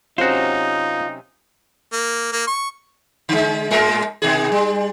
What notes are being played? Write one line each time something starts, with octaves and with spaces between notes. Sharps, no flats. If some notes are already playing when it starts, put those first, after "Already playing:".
C3 F#3 C#4 D#4 F4 F#4 C5
A#3
A#3
C#6
D3 G#3
A2 G#3 A#4
B2 D#3 G#4
G3